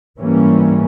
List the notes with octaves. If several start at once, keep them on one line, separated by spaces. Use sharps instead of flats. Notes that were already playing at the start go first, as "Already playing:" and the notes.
G#2 E3 G3 A#3 C#4